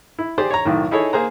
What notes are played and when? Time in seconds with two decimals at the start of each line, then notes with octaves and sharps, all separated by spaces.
0.19 E4
0.38 G4 G#4 C5 D5
0.51 C#5 A#5
0.65 B1 A2 D#3
0.91 D#4 E4 G#4 A4 C#5
1.13 A#3 G#4 C5 A#5